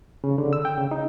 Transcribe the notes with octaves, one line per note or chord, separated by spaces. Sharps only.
C#3
D3
E6
G5
C#3
D#4